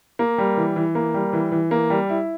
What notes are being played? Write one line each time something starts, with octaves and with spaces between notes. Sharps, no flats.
A#3
G3
E3
E3
A#3
G3
E3
E3
A#3
G3
E4